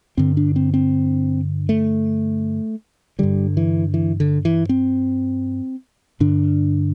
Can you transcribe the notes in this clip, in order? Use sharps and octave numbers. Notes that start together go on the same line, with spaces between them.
G2 D3 C4
D4
C4
C4
A3
G2 D3 G3
E3
E3
D3
E3
C4
G2 D3 D4